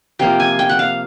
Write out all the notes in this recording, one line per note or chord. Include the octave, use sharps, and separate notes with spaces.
C3 F3 A#3 G5
G#5
G5
F#5
F5